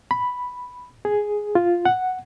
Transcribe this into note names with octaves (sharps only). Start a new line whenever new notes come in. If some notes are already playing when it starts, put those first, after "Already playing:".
B5
G#4
F4
F#5